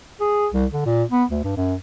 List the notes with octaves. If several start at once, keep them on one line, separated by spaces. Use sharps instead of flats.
G#4
C2
D3
A#2
B3
D2
G2
F#2